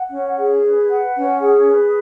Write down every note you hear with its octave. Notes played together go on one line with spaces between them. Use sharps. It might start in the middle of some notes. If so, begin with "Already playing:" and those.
Already playing: F#5
C#4
G#4
B4
F#5
C#4
G#4
B4